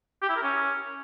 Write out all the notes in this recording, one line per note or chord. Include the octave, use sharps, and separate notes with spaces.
G4
E4
A#4
C#4